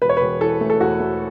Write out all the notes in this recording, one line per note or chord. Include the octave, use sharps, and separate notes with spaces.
E1 B4
C#5
E1 B4
E3 A4
A3
A4
E2 F#4
A3